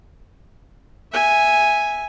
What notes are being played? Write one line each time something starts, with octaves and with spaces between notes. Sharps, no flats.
E5 G#5